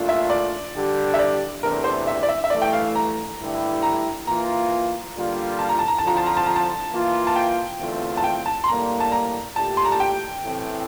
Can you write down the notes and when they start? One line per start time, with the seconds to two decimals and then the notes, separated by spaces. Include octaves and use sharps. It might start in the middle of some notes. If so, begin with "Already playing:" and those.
Already playing: A#2 A3 D4 F4
0.09 E5
0.30 D5
0.75 D3 G3 D4 G4
1.14 E5
1.19 D5
1.63 E2 C3 E3 A3 D4 A#4
1.84 C5
2.07 E5
2.23 D5
2.29 E5
2.44 E5
2.50 G2 E3 A3 E4 D5
2.62 G5
2.73 F5
2.95 A#5
3.38 G2 D3 A3 E4 G4
3.83 A#5
4.27 E3 A#3 F4 A#5
5.15 D3 G3 A#3 F4
5.59 A5
5.69 A#5
5.79 A5
5.88 A#5
5.98 A5
6.03 D3 F3 C4 F4 A#5
6.17 A5
6.26 A#5
6.37 A5
6.46 A#5
6.56 A5
6.91 E3 A#3 F4
7.27 A5
7.36 G5
7.79 E2 D3 A3 C4 F4
8.17 A5
8.24 G5
8.46 A5
8.64 C6
8.68 A2 G3 A#3 D4 A#5
9.00 A5
9.12 A#5
9.56 A#2 A3 D4 G4 A5
9.77 C6
9.85 A#5
9.92 A5
10.00 G5
10.44 A2 E3 A3 C4